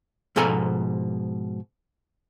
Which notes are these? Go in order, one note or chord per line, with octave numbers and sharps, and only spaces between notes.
G#2 B2 F3 A4 G#5 A#5